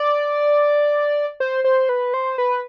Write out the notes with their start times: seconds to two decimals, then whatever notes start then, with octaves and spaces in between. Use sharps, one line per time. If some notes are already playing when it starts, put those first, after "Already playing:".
Already playing: D5
1.40 C5
1.64 C5
1.89 B4
2.14 C5
2.38 B4